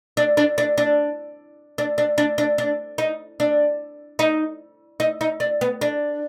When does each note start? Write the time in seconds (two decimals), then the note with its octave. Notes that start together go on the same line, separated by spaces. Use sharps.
0.17 D4
0.37 D4
0.58 D4
0.78 D4
1.78 D4
1.98 D4
2.18 D4
2.38 D4
2.58 D4
2.98 D#4
3.40 D4
4.19 D#4
5.00 D#4
5.21 D#4
5.40 D4
5.61 B3
5.81 D4